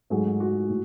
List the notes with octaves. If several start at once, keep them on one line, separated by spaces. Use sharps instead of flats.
G#2 F#3 A3 G#4
F#4
A2